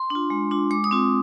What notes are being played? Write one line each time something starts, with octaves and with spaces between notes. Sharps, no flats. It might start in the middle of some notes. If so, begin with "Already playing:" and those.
Already playing: C6
D4 F4
G#3
D4 F4
G#3 D6
D#6
C4 F4